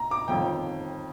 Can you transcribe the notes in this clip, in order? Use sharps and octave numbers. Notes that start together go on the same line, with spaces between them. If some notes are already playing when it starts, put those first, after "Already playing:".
Already playing: A#5
D6
G1 F2 D#3 G5